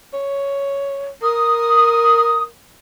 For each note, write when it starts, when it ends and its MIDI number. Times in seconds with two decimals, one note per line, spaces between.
0.13 1.10 73
1.23 2.48 70
1.23 2.41 87